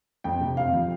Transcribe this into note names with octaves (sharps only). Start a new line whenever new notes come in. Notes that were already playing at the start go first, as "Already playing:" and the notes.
F2 G5
C3
F2 F5
F3